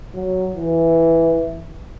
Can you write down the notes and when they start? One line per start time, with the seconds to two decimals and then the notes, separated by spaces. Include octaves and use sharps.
0.15 F#3
0.56 E3